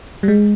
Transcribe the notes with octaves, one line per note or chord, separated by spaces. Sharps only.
G3
G#3